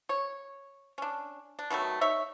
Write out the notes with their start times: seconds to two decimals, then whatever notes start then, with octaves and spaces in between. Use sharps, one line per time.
0.09 C#5
0.98 C#4 D4
1.59 D4
1.70 B2 D#3 F#3 A3
2.01 D#4 C#5 E5